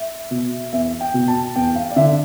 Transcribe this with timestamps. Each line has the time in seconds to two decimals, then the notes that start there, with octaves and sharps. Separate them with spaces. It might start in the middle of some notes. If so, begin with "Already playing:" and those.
Already playing: E5
0.31 B2
0.73 E2 E5
1.01 G5
1.14 B2
1.28 A5
1.56 E2 G5
1.76 F5
1.90 D5
1.96 D3 E5